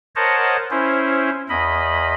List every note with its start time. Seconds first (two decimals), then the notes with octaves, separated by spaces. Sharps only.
0.16 A#4 C5 C#5 D#5 F#5 A5
0.71 C#4 E4 C5
1.49 E2 D#5 B5